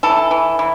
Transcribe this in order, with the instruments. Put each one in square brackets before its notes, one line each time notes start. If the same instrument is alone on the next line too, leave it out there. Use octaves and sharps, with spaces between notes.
[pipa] E3 A4
E3
E3